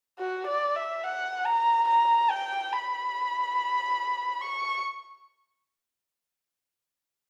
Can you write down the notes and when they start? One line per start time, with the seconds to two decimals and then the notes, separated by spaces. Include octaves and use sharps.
0.20 F#4
0.47 D5
0.76 E5
1.04 F#5
1.46 A#5
1.88 A#5
2.31 G5
2.73 B5
4.41 C#6